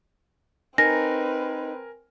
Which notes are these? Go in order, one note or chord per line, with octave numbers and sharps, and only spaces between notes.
C4 D#4 A#4 B4 G#5 A#6